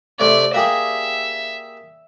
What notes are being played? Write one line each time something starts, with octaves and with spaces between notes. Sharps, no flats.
C3 A3 D5
A#3 G4 G#4 E5